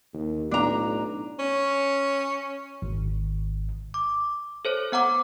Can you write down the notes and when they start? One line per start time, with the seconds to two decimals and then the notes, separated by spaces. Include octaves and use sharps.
0.14 D#2
0.51 B1 A2 D4 A#5
1.39 C#4
2.82 G#1
3.94 D6
4.65 A4 C5 C#5
4.92 B3 F#5 A#5 D6